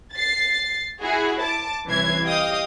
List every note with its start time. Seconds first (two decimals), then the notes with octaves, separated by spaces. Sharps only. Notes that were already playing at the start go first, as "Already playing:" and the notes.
0.13 A6 C7
1.02 E4 F#4 G#4
1.40 A5 D6
1.87 C2 E3 C#4 G#6 C7
2.23 G4 D#5 F5 G5 D#6